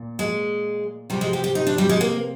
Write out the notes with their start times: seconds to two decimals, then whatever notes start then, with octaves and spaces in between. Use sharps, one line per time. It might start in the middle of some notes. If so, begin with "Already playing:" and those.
Already playing: A#2
0.19 G#3
1.10 C3 F3 G3
1.21 G#3
1.33 G4
1.44 G4
1.55 D#4
1.67 D4
1.78 G3
1.89 G#3
2.01 A#3